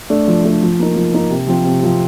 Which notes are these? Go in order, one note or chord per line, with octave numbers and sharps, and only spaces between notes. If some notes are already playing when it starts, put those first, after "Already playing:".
A3 D4
F3
A3 D4
F3
A#3 D#4
F3
A#3 D#4
C3
F3 C4 F4
C3
F3 C4 F4